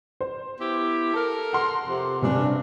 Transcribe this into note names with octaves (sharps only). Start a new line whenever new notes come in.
C5
B3 E4 G4
A4 A#4
F#5 C6
F2 C3
G2 C3 C#4 D4